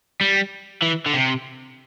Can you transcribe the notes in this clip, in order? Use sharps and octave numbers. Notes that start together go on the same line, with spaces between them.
G3
E3
D3
C3